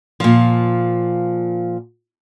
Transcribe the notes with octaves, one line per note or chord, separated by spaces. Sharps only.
A#2 F3